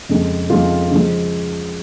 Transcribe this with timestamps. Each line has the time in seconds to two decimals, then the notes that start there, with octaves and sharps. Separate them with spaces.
0.09 F2 C#3 G#3
0.50 F2 C#3 G#3 F4
0.91 C#3 F3 G#3